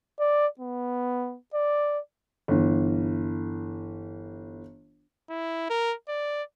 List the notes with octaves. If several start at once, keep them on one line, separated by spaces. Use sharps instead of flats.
D5
B3
D5
G1 E3
E4
A#4
D5